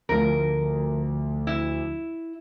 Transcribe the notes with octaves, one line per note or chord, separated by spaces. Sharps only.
D2 D3 F3 A#4
E4